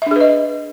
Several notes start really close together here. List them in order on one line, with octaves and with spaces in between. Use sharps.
E5 D4 G#4 B4 D#5